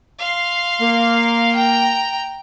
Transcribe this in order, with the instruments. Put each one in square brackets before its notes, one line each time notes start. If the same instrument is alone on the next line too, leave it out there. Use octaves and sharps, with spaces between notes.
[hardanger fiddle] F5 C6
[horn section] A#3
[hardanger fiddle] G5 A#5